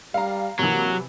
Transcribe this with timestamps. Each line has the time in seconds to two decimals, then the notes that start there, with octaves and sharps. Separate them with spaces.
0.14 G3 F5 A#5
0.59 C3 E3 F#3 A#3